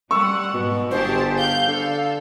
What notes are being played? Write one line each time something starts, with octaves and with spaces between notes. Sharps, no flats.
G3 F#5 C#6 E6
G#2 B2
G1 G4 G#4 C5 A5
F5 G6
D3 A4